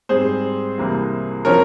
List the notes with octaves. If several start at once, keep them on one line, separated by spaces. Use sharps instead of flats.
G#2 G3 C4 G#4 C5
C2 C3 E3 A#3
C#3 F3 C4 A#4 C#5